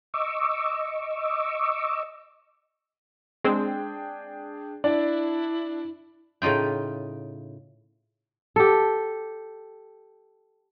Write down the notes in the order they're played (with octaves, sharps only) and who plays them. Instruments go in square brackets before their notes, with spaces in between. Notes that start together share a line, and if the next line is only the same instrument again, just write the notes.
[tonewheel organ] D#5 C#6 D6 E6
[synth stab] G#3 C4 [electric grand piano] D4 G#4 G5
[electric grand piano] D4 [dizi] E4 [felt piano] D5
[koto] A2 C#3 D#4 F4 G5
[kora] G4 A4